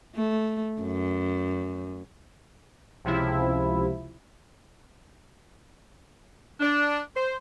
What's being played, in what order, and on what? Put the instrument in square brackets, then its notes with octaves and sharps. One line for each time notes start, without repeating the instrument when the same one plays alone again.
[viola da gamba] A3
F#2
[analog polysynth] C#2 C3 F3 E4
[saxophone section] D4
C5